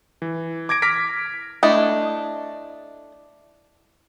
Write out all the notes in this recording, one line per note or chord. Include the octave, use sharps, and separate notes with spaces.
E3
D6 G#6 A#6 D7
D6 F6 A#6 B6 D7
A3 D4 E4 D#5